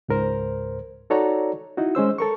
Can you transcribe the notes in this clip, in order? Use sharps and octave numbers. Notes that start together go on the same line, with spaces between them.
C#2 G#2 A#4 C5
D#4 F#4 A4 C#5 D5 A#5
D#4 E4 F#4
G#3 C#4 C5 E6
A4 A#4 C#6